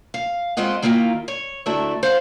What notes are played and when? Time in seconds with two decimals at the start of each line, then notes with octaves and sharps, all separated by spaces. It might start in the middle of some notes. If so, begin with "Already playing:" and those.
0.14 F5
0.57 G#3 A3 C4 F4 D#5 F#5
0.83 D#3 A#3 E4 F4 G5 A#5
1.28 C#5
1.66 D2 F#3 A3 D4 E4 E5
2.03 C5 F5 F#5